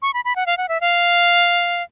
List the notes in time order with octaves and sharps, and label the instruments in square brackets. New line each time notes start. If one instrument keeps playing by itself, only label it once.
[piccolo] C#6
B5
B5
F#5
F5
F#5
E5
F5